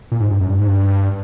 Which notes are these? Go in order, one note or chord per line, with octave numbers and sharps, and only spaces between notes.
A#2
G#2
G2
F#2
G2
G#2
G2